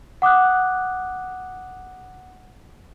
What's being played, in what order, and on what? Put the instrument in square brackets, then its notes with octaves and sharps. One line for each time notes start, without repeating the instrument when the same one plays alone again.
[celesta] F#5 D6 D#6 F#6